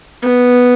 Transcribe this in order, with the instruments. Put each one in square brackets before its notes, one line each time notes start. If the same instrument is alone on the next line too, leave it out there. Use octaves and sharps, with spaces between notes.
[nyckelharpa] B3